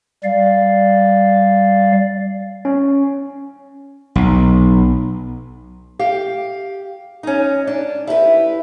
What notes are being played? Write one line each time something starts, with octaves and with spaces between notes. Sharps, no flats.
G3 D5 F5
C#4
B1
G4 F5 G5
C#4 D#4
D4
E4 G4 A#4 B4